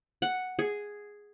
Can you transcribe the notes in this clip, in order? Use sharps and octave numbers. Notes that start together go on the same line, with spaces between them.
F#5
G#4